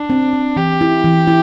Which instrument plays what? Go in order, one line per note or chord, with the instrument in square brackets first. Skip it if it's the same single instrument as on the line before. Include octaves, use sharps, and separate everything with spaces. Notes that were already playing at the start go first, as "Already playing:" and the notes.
Already playing: [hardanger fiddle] D4
[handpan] C4
C4
[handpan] E3 [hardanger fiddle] G4
[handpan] E4
E3
E4